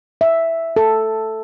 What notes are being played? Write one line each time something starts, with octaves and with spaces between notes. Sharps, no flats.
E5
A4